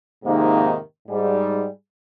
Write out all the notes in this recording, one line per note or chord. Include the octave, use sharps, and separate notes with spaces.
F2 G#2 C3 D#3 A#3 D#4
G#2 G3 G#4